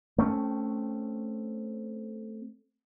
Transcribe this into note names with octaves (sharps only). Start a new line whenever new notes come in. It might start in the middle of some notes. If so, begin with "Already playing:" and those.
A3 C4 C#4